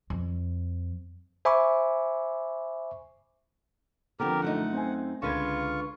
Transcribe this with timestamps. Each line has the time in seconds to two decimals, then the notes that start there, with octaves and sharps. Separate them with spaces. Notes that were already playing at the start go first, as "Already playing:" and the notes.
0.10 F2
1.45 C5 E5 G#5 B5 C#6 D6
4.20 D3 F3 B3 C4 G4 A#4
4.42 F#2 A3 D#4 F#5
4.73 C4 C5 G#5
5.22 C#2 D3 F4 B4 F5 C#6 G#6